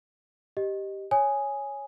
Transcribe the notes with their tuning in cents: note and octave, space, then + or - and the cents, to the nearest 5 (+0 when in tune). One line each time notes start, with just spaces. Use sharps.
G4 -5 D#5 -5
C#5 +0 G#5 +0 D#6 +0